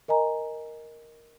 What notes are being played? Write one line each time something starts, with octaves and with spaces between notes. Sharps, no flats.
A#4 D#5 G#5 A#5